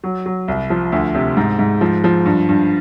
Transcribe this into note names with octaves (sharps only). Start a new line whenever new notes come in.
F#3
F#3
C2
F3
D2
C3
G#2
G#2
F3
F3
G2
G2